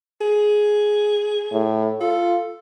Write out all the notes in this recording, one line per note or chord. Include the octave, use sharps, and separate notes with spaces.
G#4
A2
F4 A4